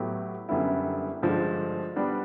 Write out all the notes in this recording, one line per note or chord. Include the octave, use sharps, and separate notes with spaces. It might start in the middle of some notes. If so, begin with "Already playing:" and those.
Already playing: A2 F#3 B3 E4 G4
F#2 D3 G3 B3 E4
G2 D3 F3 G#3
G3 B3 D4